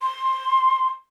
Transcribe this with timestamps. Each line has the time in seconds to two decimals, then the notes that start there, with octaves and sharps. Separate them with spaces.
0.02 C6